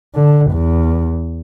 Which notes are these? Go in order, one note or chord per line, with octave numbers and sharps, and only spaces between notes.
D3
E2